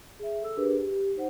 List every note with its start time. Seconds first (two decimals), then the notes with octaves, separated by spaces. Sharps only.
0.19 G#4 E5
0.42 A4 E6
0.57 D4 G4 G#4 A#4 B4
0.80 G4
0.93 G4
1.16 D#4 C5 F#5